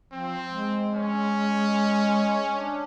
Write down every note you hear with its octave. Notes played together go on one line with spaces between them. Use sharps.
F3 C4
G#3
C#4
D4